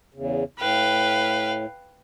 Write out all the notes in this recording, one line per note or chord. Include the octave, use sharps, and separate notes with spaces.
E2 C#3
A2 B4 F5 G5